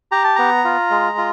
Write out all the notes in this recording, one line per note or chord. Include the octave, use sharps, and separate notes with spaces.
G4 A#5
A5
B3 A#5
F4
G#3
F4